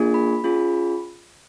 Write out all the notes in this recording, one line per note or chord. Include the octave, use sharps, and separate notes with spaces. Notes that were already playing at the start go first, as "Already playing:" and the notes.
Already playing: A#3 D4 F4 G#4
B5
C#4 F4 G#4